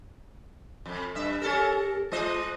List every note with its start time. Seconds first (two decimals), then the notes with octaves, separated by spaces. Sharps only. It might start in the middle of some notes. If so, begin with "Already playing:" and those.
0.86 F2
1.15 G2 E5
1.42 C#4 G4 A4 A#4
2.12 G#3 F4 C5 D#5